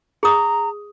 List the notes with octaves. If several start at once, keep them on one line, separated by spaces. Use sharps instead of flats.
G#4 A#5 D#6